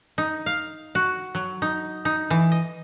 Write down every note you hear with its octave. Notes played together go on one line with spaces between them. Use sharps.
D#4
F5
F#4
F#3
D#4
D#4
E3
D#5